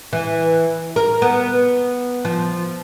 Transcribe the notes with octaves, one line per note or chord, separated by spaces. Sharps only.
E3
A#4
B3
F3